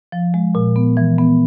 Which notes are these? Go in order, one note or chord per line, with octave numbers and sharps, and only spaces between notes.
F3
G#3
A#2
B3
E3
B3